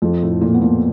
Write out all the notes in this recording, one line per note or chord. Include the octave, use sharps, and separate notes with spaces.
F2 F3
A2 A3
A#2 A#3
B3
A#2 A#3